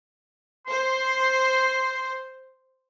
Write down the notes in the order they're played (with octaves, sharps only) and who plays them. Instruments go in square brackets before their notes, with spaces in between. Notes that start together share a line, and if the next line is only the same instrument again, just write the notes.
[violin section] C5 [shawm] C6